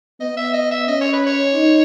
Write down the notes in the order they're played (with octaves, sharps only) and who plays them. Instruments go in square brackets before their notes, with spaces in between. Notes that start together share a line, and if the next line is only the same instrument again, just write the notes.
[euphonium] B3 [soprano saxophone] D#5
[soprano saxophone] E5
D#5
E5
[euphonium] C#4 [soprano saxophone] D#5
[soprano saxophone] C#5
B4
C#5
[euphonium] D#4